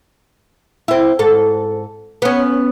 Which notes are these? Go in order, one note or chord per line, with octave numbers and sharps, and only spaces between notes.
C4 E4
G#2 A4
B3 C#4